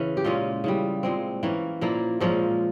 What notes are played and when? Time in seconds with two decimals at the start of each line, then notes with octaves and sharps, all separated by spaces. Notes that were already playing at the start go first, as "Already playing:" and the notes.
Already playing: C#3 E3 C#4
0.17 G4
0.24 A#2 G#3 C#4 F4
0.64 C#3 E3 G3
1.03 A#2 G#3 C4
1.43 E3 A#3 C#4
1.81 A#2 F3 A#3 E4
2.20 A#2 F3 G#3 C#4